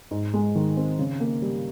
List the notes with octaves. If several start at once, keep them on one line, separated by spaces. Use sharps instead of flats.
G#2
G#3
D#3
C4
C#3
A#3
G3